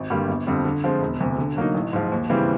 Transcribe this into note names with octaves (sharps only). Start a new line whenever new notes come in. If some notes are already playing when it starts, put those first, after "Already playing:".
Already playing: G#1
G2 D3 G3 A#3
G1
F2 D3 G3 C4
D3
F3 G#3 C4 F4
E1
D2 C3
D3
F#3 A#3 D#4
A1
G#2 F3
D#2
C#3 E3 G3 C4